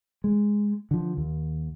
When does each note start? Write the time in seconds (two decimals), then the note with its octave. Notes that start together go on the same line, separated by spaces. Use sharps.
0.24 G#3
0.91 D3 F3
1.17 D#2